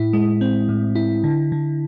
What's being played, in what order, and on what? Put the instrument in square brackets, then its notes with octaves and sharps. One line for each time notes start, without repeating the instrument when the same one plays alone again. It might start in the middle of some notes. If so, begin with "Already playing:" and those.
Already playing: [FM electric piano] A2 E4
G#3
C4
A2
E4
D3
D3